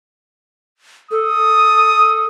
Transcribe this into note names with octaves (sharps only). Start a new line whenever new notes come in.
A4 D#6